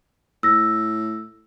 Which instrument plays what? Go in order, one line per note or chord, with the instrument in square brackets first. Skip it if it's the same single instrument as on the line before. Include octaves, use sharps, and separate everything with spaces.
[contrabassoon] A2 [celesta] E6 A#6